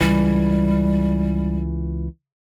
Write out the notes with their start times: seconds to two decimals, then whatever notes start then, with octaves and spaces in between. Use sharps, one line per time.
0.01 C#2 E3 G3